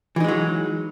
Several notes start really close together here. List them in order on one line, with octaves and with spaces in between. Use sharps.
E3 D#4 G#3 F#3